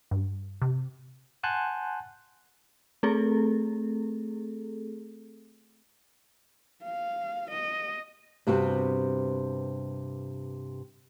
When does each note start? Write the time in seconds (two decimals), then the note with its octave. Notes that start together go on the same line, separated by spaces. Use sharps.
0.11 G2
0.62 C3
1.43 F#5 G#5 A5 C6 F#6 G6
3.03 A3 C4 G#4 A4
6.83 F5
7.50 D#5
8.47 G2 C3 B3 C4 F#4